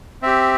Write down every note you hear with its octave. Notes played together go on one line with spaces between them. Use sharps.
C4 G4 E5